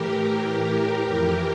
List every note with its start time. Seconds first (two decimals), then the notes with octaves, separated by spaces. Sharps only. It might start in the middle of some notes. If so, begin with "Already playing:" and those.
Already playing: A2 E3 G4 A#4
1.03 F2 E3 G4 A#4